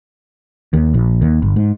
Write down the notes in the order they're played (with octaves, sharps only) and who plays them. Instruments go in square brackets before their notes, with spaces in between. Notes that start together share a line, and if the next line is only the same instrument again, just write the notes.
[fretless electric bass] D#2
A#1
D#2
G1
G#2